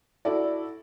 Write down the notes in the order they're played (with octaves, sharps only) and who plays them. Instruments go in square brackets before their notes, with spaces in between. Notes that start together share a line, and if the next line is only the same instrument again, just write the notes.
[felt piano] E4 F#4 A4 D5